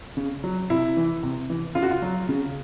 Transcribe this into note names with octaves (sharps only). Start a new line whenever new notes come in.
C#3
F#3
C3 E4
E3
C3
E3
C#3 F4
F#4
F4
F#3
C#3